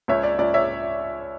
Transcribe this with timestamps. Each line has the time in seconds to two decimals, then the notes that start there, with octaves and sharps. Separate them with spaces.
0.08 C#2 C#5 E5
0.23 D5
0.38 C#2 D5
0.54 C#5 E5